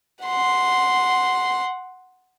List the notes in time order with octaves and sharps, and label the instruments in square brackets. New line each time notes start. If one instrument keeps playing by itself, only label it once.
[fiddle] F#5 C6